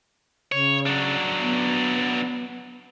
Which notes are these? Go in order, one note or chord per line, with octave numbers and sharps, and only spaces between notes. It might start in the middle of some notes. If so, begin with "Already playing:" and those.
C#3 C#5
F#3 D4
B3